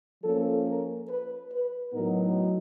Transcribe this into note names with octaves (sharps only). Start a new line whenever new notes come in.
F3 A#3 C#4 A4
A#4
B4
B4
A2 F#3 B3 D#4 A#4